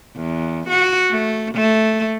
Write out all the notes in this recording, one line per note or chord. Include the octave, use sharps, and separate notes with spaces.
E2
F#4
A3
A3